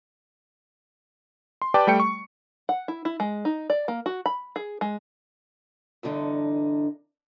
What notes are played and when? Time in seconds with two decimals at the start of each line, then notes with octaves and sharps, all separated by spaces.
1.62 C6
1.74 G4 B4 D5 G5 A5 D6
1.87 G3 A3 G5 C#7
2.00 C#6
2.69 F#5
2.88 E4
3.05 E4
3.20 G#3
3.45 D#4
3.70 D5
3.88 A#3
4.06 F#4
4.26 B5
4.56 G#4
4.81 G#3
6.03 E2 G2 D3 D#4